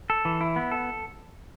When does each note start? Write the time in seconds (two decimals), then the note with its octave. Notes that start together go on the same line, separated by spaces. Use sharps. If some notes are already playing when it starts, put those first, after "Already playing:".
0.10 A4
0.25 E3
0.41 E4
0.56 B3
0.71 A4